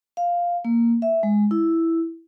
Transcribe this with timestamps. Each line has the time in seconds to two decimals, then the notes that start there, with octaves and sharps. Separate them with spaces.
0.17 F5
0.65 A#3
1.02 E5
1.23 G#3
1.51 E4